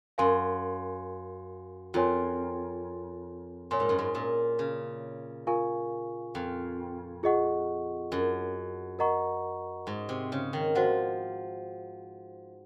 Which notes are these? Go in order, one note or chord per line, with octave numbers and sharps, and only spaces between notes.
F#2 A#4 F5 G#5 C6
F2 F4 A#4 C#5 G#5 C6
A#2 C#5 G#5 C6
G#2
F#2
G#2
A#2
C#3
F4 A#4 F5 G#5 C#6
F2
F4 G#4 D#5 F#5 C#6
F#2
A#4 D#5 F#5 A#5 C#6
G#2
C3
C#3
D#3
F3 F#4 C5 F#5